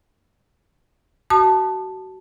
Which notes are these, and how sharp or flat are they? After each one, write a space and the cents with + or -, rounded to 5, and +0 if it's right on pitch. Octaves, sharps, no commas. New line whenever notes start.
F#4 +30 A5 +0 D#6 -40